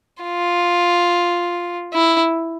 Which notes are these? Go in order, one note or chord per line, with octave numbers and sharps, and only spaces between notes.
F4
E4